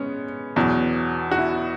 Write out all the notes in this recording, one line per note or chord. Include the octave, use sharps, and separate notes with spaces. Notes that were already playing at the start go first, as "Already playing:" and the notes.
Already playing: G#3 B3 C#4
E2 B2 F#3
F#4
E4